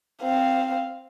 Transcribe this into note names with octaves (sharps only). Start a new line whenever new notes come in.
C4 F5